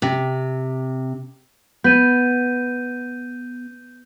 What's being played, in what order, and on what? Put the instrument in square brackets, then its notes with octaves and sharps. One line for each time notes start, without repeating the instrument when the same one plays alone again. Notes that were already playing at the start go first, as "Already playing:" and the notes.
[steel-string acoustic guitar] C3
[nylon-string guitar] B3 [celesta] G6 D#7